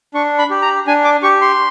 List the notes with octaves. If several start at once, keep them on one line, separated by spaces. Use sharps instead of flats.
D4 C#6
B5
G4
A#5
D4 G#5
D6
G4 C#6
C6